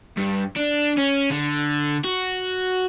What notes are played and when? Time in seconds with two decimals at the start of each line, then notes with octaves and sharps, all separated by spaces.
0.17 G2
0.57 D4
0.97 C#4
1.30 D3
2.04 F#4